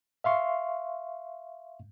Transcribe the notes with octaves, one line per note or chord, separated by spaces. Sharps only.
E5 F5 C6 C#6